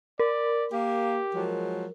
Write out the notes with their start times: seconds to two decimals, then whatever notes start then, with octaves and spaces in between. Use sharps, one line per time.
0.19 A#4 D5
0.73 A#3 G4
1.35 F3 F#3 G#3